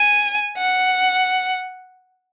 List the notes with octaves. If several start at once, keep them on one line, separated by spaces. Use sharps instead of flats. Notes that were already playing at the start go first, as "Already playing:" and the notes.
Already playing: G#5
F#5